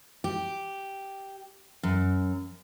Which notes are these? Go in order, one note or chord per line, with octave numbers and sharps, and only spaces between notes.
G4
F#2